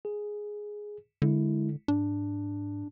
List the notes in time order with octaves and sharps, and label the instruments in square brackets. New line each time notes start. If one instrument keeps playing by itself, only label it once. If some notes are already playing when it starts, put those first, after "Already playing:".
[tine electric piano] G#4
[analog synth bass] D3 [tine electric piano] G#3 E4
[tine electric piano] G#2 [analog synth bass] D4